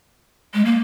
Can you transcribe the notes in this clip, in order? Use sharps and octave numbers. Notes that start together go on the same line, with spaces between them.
G#3
A#3